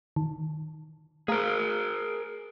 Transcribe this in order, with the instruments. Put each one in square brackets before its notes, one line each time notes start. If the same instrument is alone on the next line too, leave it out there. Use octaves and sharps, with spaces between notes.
[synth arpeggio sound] D#3
[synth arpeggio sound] A3 F5 A#5 [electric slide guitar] G#4 A#4